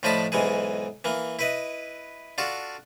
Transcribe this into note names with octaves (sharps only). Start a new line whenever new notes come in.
A2 F3 D4 D#5 A5 B5
B1 G#2 E3 G#4
E3 A#3
E4 B4 D#5
D4 F4 F#4 A4